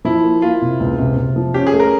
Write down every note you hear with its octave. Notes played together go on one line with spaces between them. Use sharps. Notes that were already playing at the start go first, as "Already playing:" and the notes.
F3 E4
A#3
A#3 F4
C3
C#2
C3
C3
F3
C#4 G4
G#4
A3
A#4